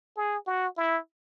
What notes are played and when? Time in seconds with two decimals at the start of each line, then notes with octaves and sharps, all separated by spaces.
0.17 G#4
0.47 F#4
0.77 E4